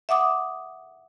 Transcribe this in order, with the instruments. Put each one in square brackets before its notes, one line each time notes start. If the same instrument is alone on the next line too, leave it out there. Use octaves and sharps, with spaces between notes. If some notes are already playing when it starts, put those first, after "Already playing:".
[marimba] E5 F#5 D6 D#6